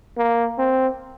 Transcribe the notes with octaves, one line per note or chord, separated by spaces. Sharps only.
A#3
C4